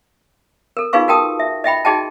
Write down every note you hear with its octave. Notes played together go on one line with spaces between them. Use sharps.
A4 A#4
D#4 F4 G#4 B4 F5 C#6
F#4 A4 A#4 G5 A5 D#6
E5
D#5 E5 G5 B5
D#4 F#4 G#4 D#5 G5 A5